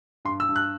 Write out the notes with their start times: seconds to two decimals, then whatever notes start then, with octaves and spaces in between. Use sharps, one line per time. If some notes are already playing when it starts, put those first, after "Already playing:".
0.25 G2 C6
0.40 E6
0.49 G2
0.56 F#6